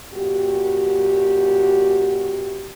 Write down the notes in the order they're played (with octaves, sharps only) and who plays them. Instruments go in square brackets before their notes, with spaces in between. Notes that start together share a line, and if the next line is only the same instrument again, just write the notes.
[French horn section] F#2 A#2 F#4 G4